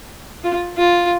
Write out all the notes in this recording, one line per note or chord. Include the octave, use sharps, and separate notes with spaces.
F4
F4